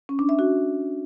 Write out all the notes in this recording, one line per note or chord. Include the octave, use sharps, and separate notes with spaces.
C#4
D4
E5
F#4